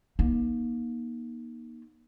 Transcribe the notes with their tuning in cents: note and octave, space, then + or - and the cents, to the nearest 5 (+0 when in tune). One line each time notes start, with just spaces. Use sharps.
A#3 +35 D#4 +0